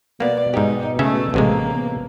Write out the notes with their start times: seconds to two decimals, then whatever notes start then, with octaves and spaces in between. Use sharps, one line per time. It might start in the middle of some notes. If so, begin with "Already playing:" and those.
0.20 B2 A#3 B3 D5
0.54 G#2 D#4 G4
0.99 C#3 A3 C#4 E5
1.34 A1 C3 G#3 A#3
1.75 B3